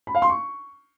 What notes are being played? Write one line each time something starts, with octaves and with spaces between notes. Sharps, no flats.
B5
F5
C6
C#6